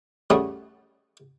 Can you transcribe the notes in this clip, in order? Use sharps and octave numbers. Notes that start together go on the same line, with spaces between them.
G3 A3 C#4 F#4 G#4